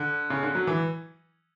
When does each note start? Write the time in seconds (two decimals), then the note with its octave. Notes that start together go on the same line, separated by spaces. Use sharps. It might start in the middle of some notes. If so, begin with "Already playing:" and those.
Already playing: D3
0.30 C#3
0.43 D3
0.55 F#3
0.67 E3